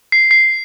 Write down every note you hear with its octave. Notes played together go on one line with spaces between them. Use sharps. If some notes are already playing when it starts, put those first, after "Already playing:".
C7
C7